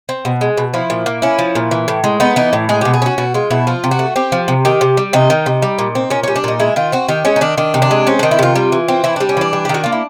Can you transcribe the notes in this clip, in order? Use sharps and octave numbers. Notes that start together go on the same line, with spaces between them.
C4
B2
G#3
B2
F3 E4
A#2
A#3
C#4 E4
F3
A#2
E3
A2
G#3
B3 D#4
E3 D#4
A2
G#3 G#4
B2 G4
G#4
C#4 F#4
B2 F#4
G#3 F4
B2 E4
F3 F4
C3
F#4
A3
C4 G4
F3
C3
D#3 G4
C3
G3
C3 D#4
D#3
C3
G3
A#2
C4
A#2 C#4
G3 C#4
D4
A#2 D#4
G#3 E4
D#3 F4
C4 F#4
D#3 G4
G#3 C#4
D#4
D#3 D4
D#3 D4
C3
D4
G#3
C4 C#4
D#3 D4
E4
C3 F4
G3
E3
C4
E3 E4
G3 D4
C#4
E3 D4
G3
G4
D#3 F#4
A#3 F4
E4